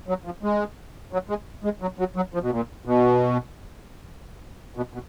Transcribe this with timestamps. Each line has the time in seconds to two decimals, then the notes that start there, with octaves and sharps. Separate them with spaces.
0.09 F#3
0.25 F3
0.43 G#3
1.13 F#3
1.29 G#3
1.64 G#3
1.82 F#3
1.99 F#3
2.16 F#3
2.34 F3
2.42 B2
2.51 A#2
2.85 B2
4.77 B2
4.93 B2